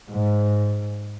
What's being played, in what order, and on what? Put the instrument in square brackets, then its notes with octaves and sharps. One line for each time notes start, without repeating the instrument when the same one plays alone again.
[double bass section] G#2